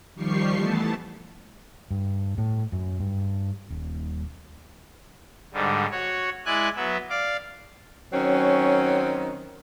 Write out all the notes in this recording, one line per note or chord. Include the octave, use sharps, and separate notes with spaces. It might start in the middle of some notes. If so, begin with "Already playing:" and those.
D#3 F3 G3 G4 C#6 C7
E3 A3 B3 A5
G2
A2
F#2
G2
D#1
G#2 D3 G3
F#4 C#5
G#3 E4 D5 G#5 F#6
F#3 B3 E5
D5 F5 D6
D#3 F#3 C4 C#4